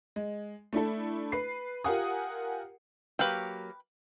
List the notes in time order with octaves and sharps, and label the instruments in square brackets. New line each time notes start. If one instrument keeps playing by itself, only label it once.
[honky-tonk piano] G#3
A3 D4 E4 A4
B4 C7
F4 G4 A#4 F#5 G#5 D#6
[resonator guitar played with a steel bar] F#3 A#3 G4 [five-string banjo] B4 G5